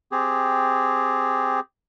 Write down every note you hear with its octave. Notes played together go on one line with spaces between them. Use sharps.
C4 G4 G#4